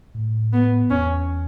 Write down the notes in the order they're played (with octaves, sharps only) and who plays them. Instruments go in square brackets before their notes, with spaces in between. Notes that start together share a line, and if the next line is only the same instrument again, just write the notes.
[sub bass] A2
[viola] B3
[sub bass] E2 [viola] C#4